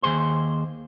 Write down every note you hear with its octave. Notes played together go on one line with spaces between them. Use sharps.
D#2 G#2 G#4 C5 C6